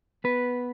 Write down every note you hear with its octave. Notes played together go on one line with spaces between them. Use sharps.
B3 B4